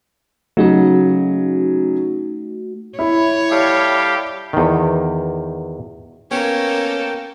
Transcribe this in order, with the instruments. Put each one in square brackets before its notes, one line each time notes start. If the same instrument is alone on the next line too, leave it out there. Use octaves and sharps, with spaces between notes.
[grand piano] C#3 F#3 [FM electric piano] A3 D#4 F#4
[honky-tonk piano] E4 [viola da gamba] C#5
[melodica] G3 A4 F5 [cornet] G4
[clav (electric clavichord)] E2 D#3
[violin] A#3 A4 [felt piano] B3 [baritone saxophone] C#4 [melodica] G5